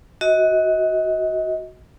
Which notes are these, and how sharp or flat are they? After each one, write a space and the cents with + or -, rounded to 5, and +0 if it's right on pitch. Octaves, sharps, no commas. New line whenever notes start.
F#4 +0 D#5 +30